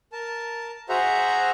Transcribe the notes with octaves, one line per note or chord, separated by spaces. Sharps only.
A#4 A5
F#4 G#4 C5 E5 F#5 A#5